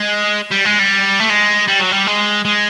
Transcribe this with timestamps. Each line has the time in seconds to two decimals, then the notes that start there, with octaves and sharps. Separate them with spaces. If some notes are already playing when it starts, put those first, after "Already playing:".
Already playing: G#3
0.52 G3
0.65 G#3
0.79 G3
1.19 A3
1.29 G#3
1.68 G3
1.80 F#3
1.92 G3
2.07 G#3
2.45 G#3